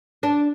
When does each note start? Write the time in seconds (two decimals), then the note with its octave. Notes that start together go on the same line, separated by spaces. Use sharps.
0.23 D4